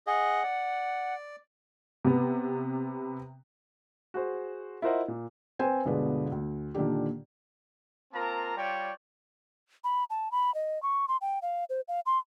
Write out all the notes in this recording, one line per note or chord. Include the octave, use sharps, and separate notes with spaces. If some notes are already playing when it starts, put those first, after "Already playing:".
G#4 D#5 F#5
D5
C3 B3
F#4 G#4 C5
E4 F4 A#4 C5 D#5 F#5
A#2
C4 B4 C5 G5 G#5
G1 B2 D3 G#3 B4 D5
D2
A#2 D3 D#3 D4 G4
A#3 C4 F4 A#4 A5 A#5
G3 F4 C#5 D5 G5
B5
A5
B5
D#5
C#6
C6
G5
F5
C5
F5
C6